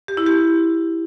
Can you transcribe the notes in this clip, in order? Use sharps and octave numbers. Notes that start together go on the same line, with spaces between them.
G4
E4
G4